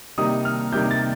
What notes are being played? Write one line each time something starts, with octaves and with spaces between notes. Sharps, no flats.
C3 D#3 G3 A#3 D#4 D#6
F6
C3 D#3 G3 A#3 D#4 G6
A6